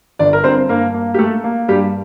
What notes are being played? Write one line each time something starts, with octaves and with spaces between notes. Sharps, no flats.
G1 D4 D5
A#4
G2 C4 C5
G2 A#3 A#4
A#3
G4
A3 A#3 A4
A#3
G2 G3 G4